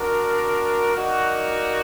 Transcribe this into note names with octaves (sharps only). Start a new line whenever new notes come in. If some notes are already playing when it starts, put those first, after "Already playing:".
Already playing: D4 F#4 A#4
A#3 D#4 F#4 A#4 D5